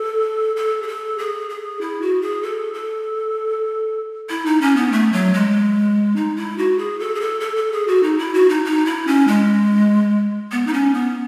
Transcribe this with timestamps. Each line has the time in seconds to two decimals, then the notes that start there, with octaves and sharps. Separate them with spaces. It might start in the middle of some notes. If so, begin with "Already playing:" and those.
Already playing: A4
0.57 A4
0.82 G#4
0.88 A4
1.18 G#4
1.50 G#4
1.81 E4
2.02 F#4
2.22 G#4
2.43 A4
2.74 A4
4.30 E4
4.46 D#4
4.61 C#4
4.76 B3
4.92 A3
5.12 F#3
5.34 G#3
6.16 D#4
6.37 E4
6.58 F#4
6.78 G#4
7.00 A4
7.15 G#4
7.20 A4
7.40 A4
7.56 A4
7.72 G#4
7.87 F#4
8.03 D#4
8.18 E4
8.34 F#4
8.49 D#4
8.65 D#4
8.86 E4
9.07 C#4
9.27 G#3
10.52 B3
10.67 D#4
10.73 C#4
10.94 B3